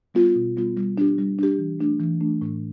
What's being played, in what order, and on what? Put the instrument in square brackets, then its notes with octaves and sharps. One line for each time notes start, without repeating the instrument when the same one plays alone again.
[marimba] G3 B3 F4
B2
G3 B3 F4
G3
D4 G4
G3
D4 G4
E3
A3 D4
E3
A3 D4
A2